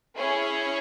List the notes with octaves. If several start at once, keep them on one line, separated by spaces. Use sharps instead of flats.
C#4 E4 G#4 C#5